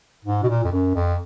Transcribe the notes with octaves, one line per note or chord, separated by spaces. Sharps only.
G#2
B2
A#2
F2
F#2
F2